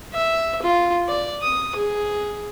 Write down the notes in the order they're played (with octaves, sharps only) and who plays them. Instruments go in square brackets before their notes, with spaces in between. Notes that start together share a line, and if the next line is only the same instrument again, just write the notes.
[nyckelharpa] E5
F4
D5
D#6
G#4